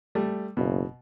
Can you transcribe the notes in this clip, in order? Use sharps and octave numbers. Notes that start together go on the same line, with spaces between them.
G3 A3
F#1 B2